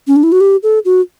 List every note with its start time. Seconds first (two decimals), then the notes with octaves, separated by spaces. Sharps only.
0.07 C#4
0.16 D4
0.23 E4
0.32 F#4
0.41 G4
0.63 A4
0.85 F#4